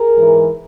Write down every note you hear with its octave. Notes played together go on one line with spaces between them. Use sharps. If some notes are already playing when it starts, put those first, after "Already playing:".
Already playing: G#4 A#4
G#2 E3